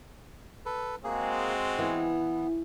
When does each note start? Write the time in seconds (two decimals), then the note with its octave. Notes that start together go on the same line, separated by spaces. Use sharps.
0.66 A4 B4
1.04 G#3 A#3 C4 F#4 G#4
1.79 E3 B3